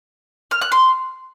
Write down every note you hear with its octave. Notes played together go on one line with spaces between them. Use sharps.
F6
F#6
C6